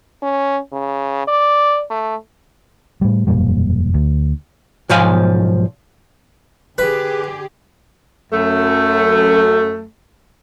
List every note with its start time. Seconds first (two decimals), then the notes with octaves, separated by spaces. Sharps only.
0.22 C#4
0.73 C#3
1.28 D5
1.90 A3
3.01 A2 G3
3.27 E1 F#2 A#2 G3
3.94 D2
4.89 B1 G#2 F3 F5 G#5
6.78 D3 G4 G#4 B4
8.33 F#2 A3